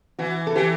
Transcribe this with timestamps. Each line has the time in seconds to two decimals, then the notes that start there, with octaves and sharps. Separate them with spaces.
0.19 E3 F#4
0.47 A4
0.55 E3 G4